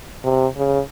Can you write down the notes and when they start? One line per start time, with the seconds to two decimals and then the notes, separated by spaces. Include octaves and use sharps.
0.24 C3
0.57 C#3